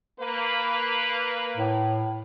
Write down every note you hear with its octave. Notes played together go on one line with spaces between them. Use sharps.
A#3 B4
A2